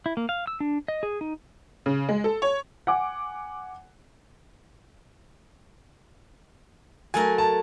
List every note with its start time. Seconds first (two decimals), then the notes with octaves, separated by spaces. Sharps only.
0.06 E4
0.17 A#3
0.29 F5
0.47 E6
0.60 D4
0.88 D#5
1.03 G#4
1.21 D#4
1.86 C#3
2.09 G#3
2.24 A4
2.42 C#5
2.87 F#5 G#5 D6
7.14 F#3 A3 A#4 G#5
7.38 A5